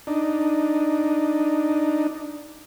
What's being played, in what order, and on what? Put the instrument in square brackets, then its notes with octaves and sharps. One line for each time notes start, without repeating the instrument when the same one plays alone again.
[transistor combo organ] D4 D#4